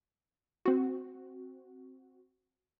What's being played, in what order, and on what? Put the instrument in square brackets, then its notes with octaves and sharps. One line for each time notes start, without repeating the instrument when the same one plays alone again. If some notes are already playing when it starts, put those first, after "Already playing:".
[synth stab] C4 F#4